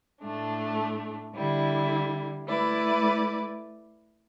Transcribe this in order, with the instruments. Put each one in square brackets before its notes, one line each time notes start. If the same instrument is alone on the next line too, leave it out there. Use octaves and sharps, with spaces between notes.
[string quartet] A2 A3 D4
D3 G3 E4
A3 E4 B4 D5